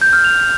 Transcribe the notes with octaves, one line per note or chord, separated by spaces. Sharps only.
G6
F6
F7